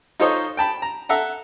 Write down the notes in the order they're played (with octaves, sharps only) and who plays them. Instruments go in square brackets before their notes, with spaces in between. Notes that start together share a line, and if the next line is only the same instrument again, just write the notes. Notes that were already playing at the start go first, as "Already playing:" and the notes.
[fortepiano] D#4 F4 A4 C5 C#5 D#5
G5 A5 B5
A#5
A4 E5 F#5 A#5